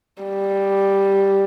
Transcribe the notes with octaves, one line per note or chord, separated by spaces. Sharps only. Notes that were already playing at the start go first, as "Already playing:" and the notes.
G3